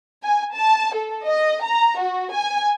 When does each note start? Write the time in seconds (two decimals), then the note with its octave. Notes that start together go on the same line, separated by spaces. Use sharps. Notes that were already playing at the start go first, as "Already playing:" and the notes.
0.23 G#5
0.55 A5
0.95 A4
1.26 D#5
1.64 A#5
1.99 F#4
2.33 G#5